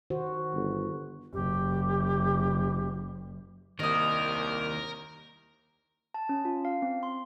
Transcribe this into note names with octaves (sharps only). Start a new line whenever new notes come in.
D#3 F#4 C5
G1
F#1 G4
C2 D#3 A#3 A#4 D#5 D#6
A5
C#4
F4
F5
C4
C6